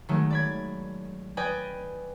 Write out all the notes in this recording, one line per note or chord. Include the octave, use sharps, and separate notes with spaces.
D#3 F#3 G#3 A3
D5 B5 G#6
B4 D5 D#5 G5 G#5 B5